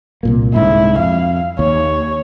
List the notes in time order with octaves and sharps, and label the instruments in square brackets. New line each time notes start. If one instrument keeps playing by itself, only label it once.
[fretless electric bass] C2 A#2 A#3
[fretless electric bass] C2 G#2 D3 [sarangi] E4
[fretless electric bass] F2 [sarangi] F5
[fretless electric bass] D#2 [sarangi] C#5